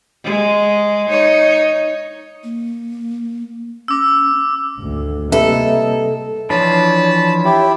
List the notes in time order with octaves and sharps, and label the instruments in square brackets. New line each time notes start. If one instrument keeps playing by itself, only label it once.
[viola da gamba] G#3
D#4 C#5
[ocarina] A#3
[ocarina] C#4 [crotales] D6 E6
[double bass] G#1 D2
[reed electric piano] C3 G3 B4 [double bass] A#3 D#4 [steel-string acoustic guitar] A4 [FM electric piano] E5
[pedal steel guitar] E3 F3 D4 [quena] C#5 [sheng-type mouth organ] A5 B5
[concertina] E4 G4